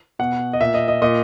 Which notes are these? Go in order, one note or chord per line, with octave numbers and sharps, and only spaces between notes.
B2 F#5
D#5
A#2 E5
D#5
D#5
A#2 D#5